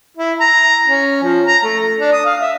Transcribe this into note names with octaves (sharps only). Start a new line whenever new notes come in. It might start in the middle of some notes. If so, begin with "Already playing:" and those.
E4
A#5
C#4
F3
A#5
A3
D4
D#6
F5
E5